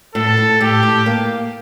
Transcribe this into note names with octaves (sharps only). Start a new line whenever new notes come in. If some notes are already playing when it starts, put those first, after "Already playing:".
A2 A4
A2
A2 G4
A2
A#3